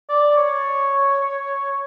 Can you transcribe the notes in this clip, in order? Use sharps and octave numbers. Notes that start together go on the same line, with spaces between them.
D5
C#5